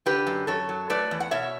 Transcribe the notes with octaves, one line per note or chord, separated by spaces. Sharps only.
D3 G4 B4
F#2
F#2 A4 C#5
F#3
A3 B4 D5
E2
F#5
B2 C#5 E5